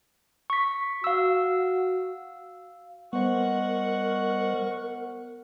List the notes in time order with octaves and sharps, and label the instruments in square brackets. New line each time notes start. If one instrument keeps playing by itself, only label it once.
[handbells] C#6 B6
[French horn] F#4 [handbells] F5 E6
[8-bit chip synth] G3 D#5 [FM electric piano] B3 C5 [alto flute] A#4 [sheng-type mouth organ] F#5 C#6